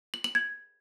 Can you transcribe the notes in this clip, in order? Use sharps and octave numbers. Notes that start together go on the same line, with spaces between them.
F#7
F#7
G#6